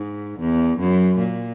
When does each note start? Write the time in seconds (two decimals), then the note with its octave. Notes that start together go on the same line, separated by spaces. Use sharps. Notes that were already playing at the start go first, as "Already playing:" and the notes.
Already playing: G#2
0.40 E2
0.79 F#2
1.18 A#2